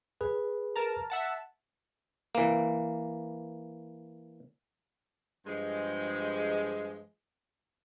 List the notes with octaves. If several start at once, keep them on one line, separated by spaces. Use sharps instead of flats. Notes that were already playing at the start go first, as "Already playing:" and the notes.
G#4 B4
A#4 A5 A#5
E5 F#5 A5
E3 A#3
G2 F3 G#3